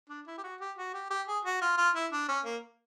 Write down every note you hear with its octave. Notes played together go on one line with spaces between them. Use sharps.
D4
E4
G4
F#4
G4
F#4
G4
G4
G#4
F#4
F4
F4
E4
D4
C#4
A#3